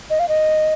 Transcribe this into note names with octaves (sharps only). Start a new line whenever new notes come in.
D#5
F5
D#5